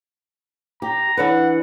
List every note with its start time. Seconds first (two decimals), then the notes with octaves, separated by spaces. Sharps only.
0.82 G4 A#5
1.17 E3 D4 B4 F#5